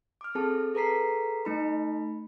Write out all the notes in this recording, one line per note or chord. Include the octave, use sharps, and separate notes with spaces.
D6 F6
C4 G#4 A4 A5
G#4 A4 B4 A#5 B6 C7
A3 D#4 B5